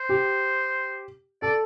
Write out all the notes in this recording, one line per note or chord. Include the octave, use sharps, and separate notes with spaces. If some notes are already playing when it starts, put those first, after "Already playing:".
Already playing: C5
G4
A4 D5